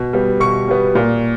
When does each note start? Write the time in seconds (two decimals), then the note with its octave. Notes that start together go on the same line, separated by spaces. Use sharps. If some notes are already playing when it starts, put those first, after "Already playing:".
Already playing: B2
0.13 G3 B3
0.40 B2 C#6
0.68 G3 B3
0.95 A#2